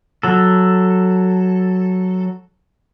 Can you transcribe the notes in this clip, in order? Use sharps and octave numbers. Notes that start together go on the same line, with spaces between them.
F#3 A4